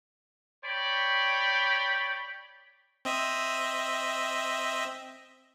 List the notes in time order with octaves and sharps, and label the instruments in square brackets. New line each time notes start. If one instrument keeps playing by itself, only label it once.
[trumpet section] C#5 D5 G5 B5
[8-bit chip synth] C4 D#5 E5